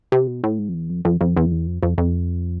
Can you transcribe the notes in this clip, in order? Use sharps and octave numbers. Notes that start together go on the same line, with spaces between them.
C3
B2
A2
G#2
F2
E2
F2
F2
F2
E2
F2
E2
F2
F2
F2